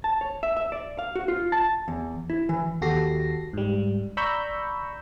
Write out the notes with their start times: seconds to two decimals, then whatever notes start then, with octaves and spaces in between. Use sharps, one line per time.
0.04 A5
0.21 C#5
0.43 E5
0.57 E5
0.72 D5
0.99 F5
1.16 F#4
1.28 F4
1.52 A5
1.88 E2
2.30 E4
2.49 E3
2.82 D#2 F#4 G4 A4 A#6 C7
3.53 G#2 G3
4.17 D5 A#5 B5 C#6 E6 G6